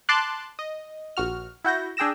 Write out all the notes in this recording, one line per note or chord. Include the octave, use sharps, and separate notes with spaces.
A5 C6 D6 F#6
D#5
A#1 F#4 F6
E4 F#4 G6 A#6
D4 G#4 G5 E6 A#6 E7